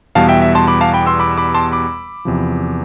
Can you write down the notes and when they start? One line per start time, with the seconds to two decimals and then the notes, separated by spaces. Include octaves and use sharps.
0.15 E2 B2 G3 B3 F5 A5
0.28 E5 G5
0.42 E5
0.55 A5 C6
0.68 B5 D6
0.81 F5 A5
0.94 G5 B5
1.06 C6 E6
1.20 B5 D6
1.38 B5 D6
1.55 A5 C6
1.72 B5 D6
2.25 E2 C3 F3